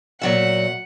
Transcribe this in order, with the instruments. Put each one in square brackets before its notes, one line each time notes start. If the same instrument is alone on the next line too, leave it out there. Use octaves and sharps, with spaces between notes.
[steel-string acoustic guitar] A#2 F#3 E5 [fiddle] F#5